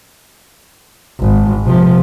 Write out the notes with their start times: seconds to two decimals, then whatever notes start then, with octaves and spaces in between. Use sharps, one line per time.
1.20 G#1
1.65 C3 F3